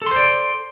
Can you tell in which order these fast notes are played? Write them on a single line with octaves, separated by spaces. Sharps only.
A4 C6 C5 D5